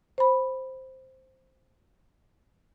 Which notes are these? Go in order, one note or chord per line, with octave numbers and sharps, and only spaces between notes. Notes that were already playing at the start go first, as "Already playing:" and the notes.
C5 B5